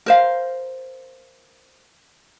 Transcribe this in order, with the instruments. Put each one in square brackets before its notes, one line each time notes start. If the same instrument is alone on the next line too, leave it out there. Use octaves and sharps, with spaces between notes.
[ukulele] A#4 C5 F5